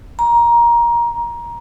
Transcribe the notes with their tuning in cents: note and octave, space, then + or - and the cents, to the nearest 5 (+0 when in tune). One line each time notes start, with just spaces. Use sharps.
A#5 +20